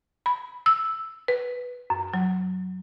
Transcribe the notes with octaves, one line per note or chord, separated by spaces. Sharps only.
B5
E6
B4
F#2
F#3